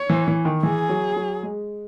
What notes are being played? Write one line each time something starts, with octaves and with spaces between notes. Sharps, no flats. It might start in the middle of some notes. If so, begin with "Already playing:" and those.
Already playing: C#5
E3
E3
D#3
E3 G#4
F#3
F#3
G#3